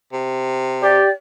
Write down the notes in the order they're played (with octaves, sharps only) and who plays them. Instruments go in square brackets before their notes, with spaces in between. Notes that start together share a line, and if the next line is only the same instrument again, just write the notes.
[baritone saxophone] C3
[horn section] G4 [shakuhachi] D5